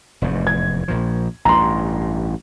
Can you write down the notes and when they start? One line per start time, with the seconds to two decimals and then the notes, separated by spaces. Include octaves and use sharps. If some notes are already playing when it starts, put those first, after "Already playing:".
0.22 F1 E2 G#2
0.47 G#6
0.88 A#1 A#2 F3
1.45 A1 G2 A#5 C6